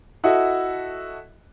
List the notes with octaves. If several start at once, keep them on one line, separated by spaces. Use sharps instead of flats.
E4 F#4 A4 D#5 E5